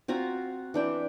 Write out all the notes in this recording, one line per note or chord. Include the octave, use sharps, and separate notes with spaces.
C4 F4 F#4 A#5
E3 D4 G5